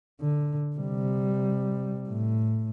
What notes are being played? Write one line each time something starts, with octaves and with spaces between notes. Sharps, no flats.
D3
C3 G3
A2